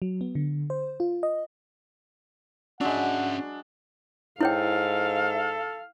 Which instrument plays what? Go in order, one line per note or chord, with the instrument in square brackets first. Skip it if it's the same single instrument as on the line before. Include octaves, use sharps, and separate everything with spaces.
[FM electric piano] F#3
B3
D3
C5
F4
D#5
[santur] F#3 G#3 [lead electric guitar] C#4 E5 [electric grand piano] D4 [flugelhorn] F#5
[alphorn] G#2 [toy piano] E4 C#5 G5 [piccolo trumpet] A4 [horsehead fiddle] F5